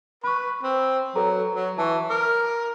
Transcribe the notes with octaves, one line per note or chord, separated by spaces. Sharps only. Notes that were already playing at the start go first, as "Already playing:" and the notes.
B4 B5 C#6
C4
F#3 A4 B4 A#5
F#3
E3 A5 C#6
A#4 D6